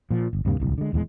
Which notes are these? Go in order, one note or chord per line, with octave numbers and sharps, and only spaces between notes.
A#2 F3
G1
D2 G2 C3 A#3
D1 C2
D3 G#3
D#1 E2 B2 G#3